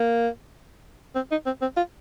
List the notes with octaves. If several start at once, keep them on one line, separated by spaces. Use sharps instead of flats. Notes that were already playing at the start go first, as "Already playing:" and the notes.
Already playing: A#3
C4
D#4
C4
C4
F4